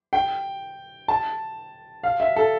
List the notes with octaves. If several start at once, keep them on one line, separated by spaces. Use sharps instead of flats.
G5
A5
F5
E5
A4